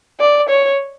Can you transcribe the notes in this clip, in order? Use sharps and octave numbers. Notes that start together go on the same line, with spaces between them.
D5
C#5